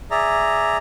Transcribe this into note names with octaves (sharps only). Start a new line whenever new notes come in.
G#4 D5 E5 A#5